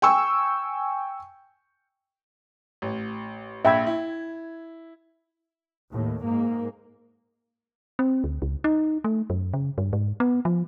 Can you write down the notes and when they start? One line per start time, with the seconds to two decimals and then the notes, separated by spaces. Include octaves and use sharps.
0.02 G5 G#5 C#6 E6
2.82 A1
3.65 A#1 E5 G5 B5 G#6
3.87 E4
5.91 D#2 A2
6.23 G#2 A#3
7.99 C4
8.24 D2
8.42 C#2
8.64 D#4
9.04 A3
9.30 F#2
9.54 C#3
9.78 G2
9.93 G#2
10.20 B3
10.45 F3